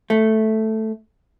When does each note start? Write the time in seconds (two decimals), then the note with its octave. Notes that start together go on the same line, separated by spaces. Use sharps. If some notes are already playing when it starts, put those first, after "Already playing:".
0.10 A3